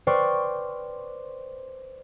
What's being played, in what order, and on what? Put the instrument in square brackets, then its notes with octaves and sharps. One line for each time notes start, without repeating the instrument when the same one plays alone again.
[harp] B4 C5 D5 G5 C#6 F6